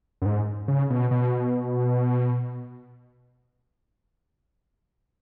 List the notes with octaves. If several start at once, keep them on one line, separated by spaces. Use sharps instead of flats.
F#2
G#2
C#3
B2
B2